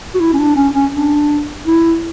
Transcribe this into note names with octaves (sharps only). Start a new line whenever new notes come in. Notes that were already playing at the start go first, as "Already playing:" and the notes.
F#4
E4
C#4
D4
C#4
C#4
D4
E4